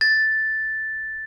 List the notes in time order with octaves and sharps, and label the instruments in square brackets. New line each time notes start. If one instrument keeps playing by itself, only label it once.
[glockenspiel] A6